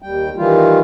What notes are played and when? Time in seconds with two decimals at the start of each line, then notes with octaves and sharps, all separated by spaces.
0.02 D#2 G3 G5
0.37 D#3 E3 G3 F4